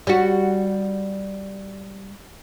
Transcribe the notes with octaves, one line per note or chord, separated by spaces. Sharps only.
G3 F#4